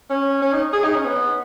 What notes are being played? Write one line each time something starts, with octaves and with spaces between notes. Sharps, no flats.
C#4
C#4
D#4
G#4
D#4
C#4
B3